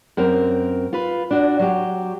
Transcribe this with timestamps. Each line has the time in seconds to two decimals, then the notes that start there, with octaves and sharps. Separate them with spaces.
0.17 F#2 C4 A#4
0.93 F4 B4
1.31 D4 F#4
1.59 F#3 G4